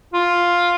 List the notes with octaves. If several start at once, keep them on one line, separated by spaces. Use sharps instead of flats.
F4